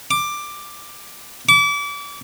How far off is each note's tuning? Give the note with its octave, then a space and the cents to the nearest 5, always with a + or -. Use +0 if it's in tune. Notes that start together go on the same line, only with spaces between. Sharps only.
D6 +10
D6 -35